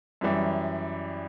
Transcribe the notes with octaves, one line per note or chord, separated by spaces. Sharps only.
F#2 E3 G3